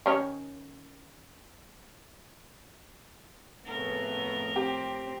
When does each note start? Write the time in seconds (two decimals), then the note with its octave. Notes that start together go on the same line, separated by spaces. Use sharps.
0.06 D#3 C#4 C#5
3.66 F2 A2 C#3 A3 B3 A#4
4.56 C4 G4